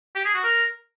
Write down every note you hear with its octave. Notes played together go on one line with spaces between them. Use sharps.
G4
G#4
F#4
A#4